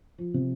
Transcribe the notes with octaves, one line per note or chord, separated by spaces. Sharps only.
F3
C3